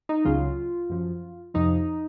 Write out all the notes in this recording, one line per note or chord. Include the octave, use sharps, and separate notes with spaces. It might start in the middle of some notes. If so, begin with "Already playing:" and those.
D#4
C#2 C#3 F#3 F4
F#2 F3
F2 C3 F3 D#4